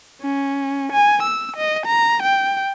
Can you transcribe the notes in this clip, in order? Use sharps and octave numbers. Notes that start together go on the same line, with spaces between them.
C#4
G#5
E6
D#5
A#5
G5